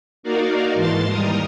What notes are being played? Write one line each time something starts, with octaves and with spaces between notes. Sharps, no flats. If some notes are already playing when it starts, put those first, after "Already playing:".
A#3 D#4 F#4 A#4 D5 F5
G#2 E3 A5 C6 A6
D#2 G3 A#4 A#5 D#6